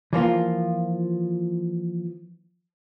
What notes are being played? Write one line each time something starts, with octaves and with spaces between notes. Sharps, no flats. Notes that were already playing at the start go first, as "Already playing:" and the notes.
E3 F3 A#3 F4